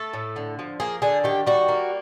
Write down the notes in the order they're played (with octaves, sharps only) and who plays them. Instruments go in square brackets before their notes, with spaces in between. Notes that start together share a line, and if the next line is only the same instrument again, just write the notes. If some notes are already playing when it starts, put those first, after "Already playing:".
Already playing: [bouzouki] A3 A4
A2
D3
F3
A#3 G#4
D3 G#4
D#3 G4
G3 F#4
A#3